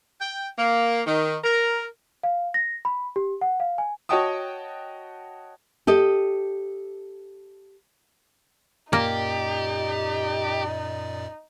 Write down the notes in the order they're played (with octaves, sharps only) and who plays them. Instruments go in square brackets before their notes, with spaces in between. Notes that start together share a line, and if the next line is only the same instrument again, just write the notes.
[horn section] G5
A#3
D#3
A#4
[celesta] F5
A#6
B5
G4
F#5
F5
G#5
[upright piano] F#4 C#5 D#5 G5 A5 D#6
[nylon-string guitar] G4 A4 D#5
[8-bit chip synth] F#2 A#2 D5 [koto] A#3 [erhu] D#4 [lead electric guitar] G4